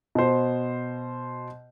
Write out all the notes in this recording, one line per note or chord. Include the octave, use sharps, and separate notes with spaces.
B2 C5